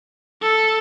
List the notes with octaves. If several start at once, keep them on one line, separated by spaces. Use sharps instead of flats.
A4